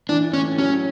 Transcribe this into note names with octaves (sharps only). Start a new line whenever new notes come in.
E3 D4
A2 C#4
F#3 C#4